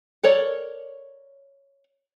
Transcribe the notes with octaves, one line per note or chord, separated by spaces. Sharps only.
A4 A#4 C#5 D5